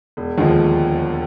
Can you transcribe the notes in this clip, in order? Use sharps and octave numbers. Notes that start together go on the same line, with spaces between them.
E1
D#2 D3 F3 G#3